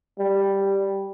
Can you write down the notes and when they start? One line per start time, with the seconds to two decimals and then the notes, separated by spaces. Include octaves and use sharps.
0.19 G3